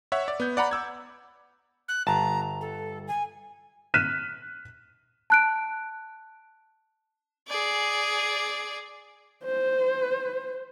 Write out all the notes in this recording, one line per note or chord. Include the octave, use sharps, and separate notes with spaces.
C#5 E5 F#5
D5
B3 G6
D5 F#5 A#5 B5
D6 E6 G#6
F#6
G1 A5 A#5
A4
G#5
F6 F#6 B6 D#7 E7
A5 F#6 D7
G#4 D5
C5